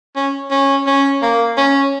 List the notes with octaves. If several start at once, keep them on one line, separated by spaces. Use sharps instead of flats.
C#4
C#4
C#4
A#3
C#4